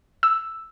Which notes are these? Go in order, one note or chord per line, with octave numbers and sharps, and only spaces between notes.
E6